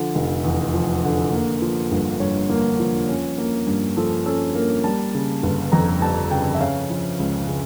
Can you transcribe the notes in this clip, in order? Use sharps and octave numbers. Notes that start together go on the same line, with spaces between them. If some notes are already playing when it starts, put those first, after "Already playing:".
Already playing: D3 F3
F1
E2
F3
D3
A#3
F3
G1
G2 C#5
A#3
F3
C#4
A#3
G2
F3 A4
C#4 A4
A#3 A#4
G3 A5
C#3
G1
F2 A#5
G3 A5
C#3 G5
E5
C#4 F5
F3
C#2
C#3